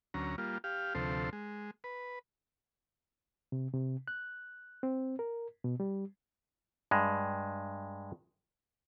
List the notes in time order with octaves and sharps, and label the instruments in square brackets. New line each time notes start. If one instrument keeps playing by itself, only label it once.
[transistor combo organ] D2 F#3 C#4 A#5
G3 A#3 F4
G4 F5
D2 C3 F3 A4 C5
G#3
B4
[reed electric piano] C3
C3
F#6
C4
A#4
B2
G3
[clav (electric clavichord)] G2 G#3